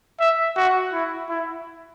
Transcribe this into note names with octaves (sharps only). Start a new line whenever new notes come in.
E5
F#4
E4
E4